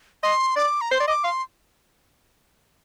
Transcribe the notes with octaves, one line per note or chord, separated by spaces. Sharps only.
D#5 C6
D5 D6
A#5
C5 C6
D5
D#5 D6
F5 C6